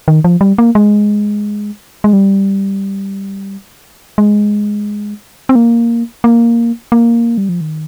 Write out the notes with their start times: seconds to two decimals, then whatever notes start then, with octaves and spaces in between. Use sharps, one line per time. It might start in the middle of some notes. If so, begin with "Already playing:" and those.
0.08 D#3
0.24 F3
0.41 G3
0.58 A#3
0.75 G#3
2.04 G#3
2.13 G3
4.18 G#3
5.49 C4
5.55 A#3
6.24 A#3
6.92 A#3
7.38 G3
7.49 F3
7.61 D#3